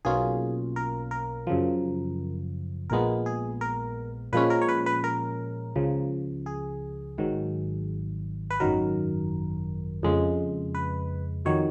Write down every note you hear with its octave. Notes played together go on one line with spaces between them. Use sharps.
B1 B2 A#3 C#4 F4 G#4
A#4
A#4
F#2 C#3 F3
A#1 A#2 G#3 B3 A#4
G#4
A#4
A#2 F3 G#3 C#4 B4
A#4
C#5
B4
B4
A#4
C#2 C#3 F3
G#4
G#1 G#2 D#3 F#3
B4
G#1 F#2 D#3 F#3 A#4
F2 C#3 G#3
B4
F2 D#3 F#3 C#5